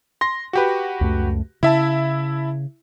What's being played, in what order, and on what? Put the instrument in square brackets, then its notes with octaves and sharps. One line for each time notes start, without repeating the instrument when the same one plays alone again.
[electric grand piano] C6 A#6
F#4 G4 B4
[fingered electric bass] C#2 F#2 A3
[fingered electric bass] C#3 [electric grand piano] E4 E5 A5